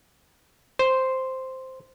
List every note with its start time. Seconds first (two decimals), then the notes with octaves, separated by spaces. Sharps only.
0.79 C5